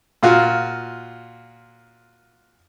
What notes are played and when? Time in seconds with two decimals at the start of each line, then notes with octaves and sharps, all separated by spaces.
0.23 A#2 F4 F#4